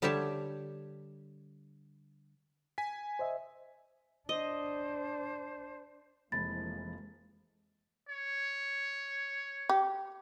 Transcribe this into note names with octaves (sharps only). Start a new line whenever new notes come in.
D3 G3 G4 C#5 E5 A5
G#5 B6
C5 D#5 E5
D4 C5 D#5
F1 E3 F3 G#3 A#3 B5 A6
C#5
G4